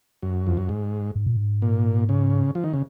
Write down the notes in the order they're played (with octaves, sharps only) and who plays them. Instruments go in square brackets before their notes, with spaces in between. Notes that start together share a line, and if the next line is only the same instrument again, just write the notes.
[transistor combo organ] F#2
F2
F#2
G#2
[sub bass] G#2
A#2
G#2
[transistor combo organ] A#2
C#3
F3
D#3
C#3